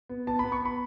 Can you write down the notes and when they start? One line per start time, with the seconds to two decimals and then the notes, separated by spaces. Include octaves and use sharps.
0.09 B3
0.27 B3 A5
0.39 B5
0.44 B3
0.52 C#6
0.62 B3 B5